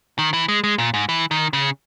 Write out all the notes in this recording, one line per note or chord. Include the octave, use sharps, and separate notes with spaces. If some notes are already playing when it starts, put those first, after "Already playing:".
D#3
E3
G#3
G#3
A#2
G#2
E3
D#3
C#3